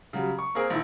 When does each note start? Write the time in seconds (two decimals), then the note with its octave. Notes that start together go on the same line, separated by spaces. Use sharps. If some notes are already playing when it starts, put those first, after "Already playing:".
0.13 C#3 F#3 G3
0.39 C#6
0.55 A#3 C4 G#4 A#4
0.70 A#1 D#3 E4